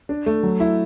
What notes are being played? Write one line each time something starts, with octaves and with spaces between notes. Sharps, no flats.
D4
A3
F#3
E4